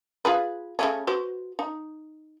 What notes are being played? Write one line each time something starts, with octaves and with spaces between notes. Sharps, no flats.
F4 G#4 B4
C#3 A3 C#4
F#4 B4 C5
D#4